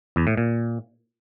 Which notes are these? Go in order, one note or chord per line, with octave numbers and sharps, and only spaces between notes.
E2
A2
A#2